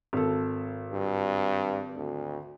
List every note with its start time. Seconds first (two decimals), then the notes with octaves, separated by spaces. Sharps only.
0.13 G#1 A4
0.92 G2
1.96 D2